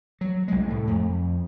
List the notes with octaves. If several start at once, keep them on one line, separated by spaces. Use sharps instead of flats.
F#3
C2 G#3
A2 A3
F2